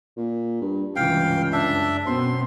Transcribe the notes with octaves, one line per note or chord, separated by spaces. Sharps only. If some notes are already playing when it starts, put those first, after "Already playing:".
A#2
G2
C#2 G2 C3 E3 F5 G5
F#2 D4 E5
F#2 B2 B3 C4 C6